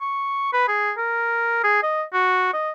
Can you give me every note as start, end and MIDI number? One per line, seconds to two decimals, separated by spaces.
0.01 0.52 85
0.53 0.67 71
0.68 0.92 68
0.97 1.60 70
1.64 1.83 68
1.83 2.03 75
2.14 2.51 66
2.53 2.71 75